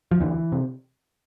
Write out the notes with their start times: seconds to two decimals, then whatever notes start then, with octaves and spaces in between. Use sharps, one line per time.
0.11 F3
0.20 D2 D3 E3
0.52 C3